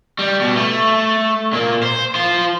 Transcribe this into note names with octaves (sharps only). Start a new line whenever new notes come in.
G3
B2
A3
A#2 A#3
C5
F4 C5